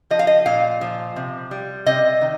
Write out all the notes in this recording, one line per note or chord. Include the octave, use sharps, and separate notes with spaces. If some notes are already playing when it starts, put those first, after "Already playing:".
F3 D#5
F5
D#5
A#2 F5
F3
C3
G3
C3 D#5
D#3